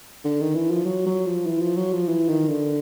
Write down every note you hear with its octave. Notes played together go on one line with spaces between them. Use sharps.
D3
D#3
E3
F3
F#3
F#3
F3
E3
F3
F#3
F3
E3
D#3
D3